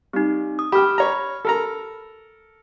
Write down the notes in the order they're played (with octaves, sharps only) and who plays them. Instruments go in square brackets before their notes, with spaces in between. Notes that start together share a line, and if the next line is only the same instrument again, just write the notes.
[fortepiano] G3 [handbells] C4 D#4
[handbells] D#6
[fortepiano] G4 G5 [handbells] B5 F6
[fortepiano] C#5 A#5
A4 A#4 A#5